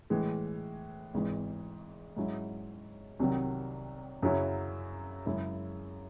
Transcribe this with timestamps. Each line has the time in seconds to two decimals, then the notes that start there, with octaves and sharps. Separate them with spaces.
0.10 A2 E3 G#3
1.14 G#1 G#2 E3
2.17 G#2 F#3 C#4 E4
3.19 C2 C3 D#3 F#3
4.22 F#2 C#3 F#3 C#4 E4
5.26 F#2 C#3 G#3 C#4 E4